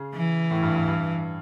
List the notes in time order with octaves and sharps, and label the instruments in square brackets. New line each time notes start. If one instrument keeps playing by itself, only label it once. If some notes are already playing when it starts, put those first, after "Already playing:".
Already playing: [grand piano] C#3
[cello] E3
[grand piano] A2
G2
G2
G2